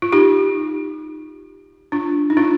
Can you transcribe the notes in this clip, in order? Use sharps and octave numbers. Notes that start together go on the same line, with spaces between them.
F4
D#4 G4
D4 F4
D#4
D4 F4